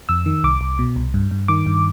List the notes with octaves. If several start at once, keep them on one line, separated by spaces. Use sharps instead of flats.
F2 E6
D#3
C2 D6
C2
B2
C2
G2
G2
D#3 D6
G2